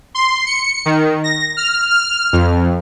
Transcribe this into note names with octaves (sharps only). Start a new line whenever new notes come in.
C6
C#7
D#3
A#6
F6
F6
F2